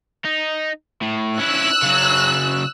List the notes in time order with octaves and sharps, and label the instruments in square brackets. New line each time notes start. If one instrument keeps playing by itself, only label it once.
[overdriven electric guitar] D#4
A2
[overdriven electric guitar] C#4 E4 [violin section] E6 F#6
[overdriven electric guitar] C#3 F#3